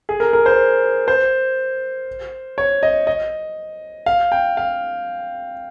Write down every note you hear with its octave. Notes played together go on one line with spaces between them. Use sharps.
G#4
A#4
A#4
C5
C5
C#5
D#5
D#5
F5
G5
F5